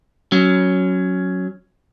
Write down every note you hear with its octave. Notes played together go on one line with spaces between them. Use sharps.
F#3 C#4